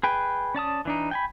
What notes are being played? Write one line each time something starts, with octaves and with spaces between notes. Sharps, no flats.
G#4 B4 G5
C#4 D5 A5 D#6
E3 D4 D#4
G5 G#5 B5